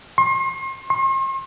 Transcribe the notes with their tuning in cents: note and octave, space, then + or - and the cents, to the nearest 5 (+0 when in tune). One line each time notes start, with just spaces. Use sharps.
C6 +40
C6 +45